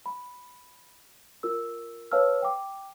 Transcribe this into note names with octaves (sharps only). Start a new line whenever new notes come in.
B5
F4 A#4 E6
B4 C#5 F5 A5 E6 F6
G5 D6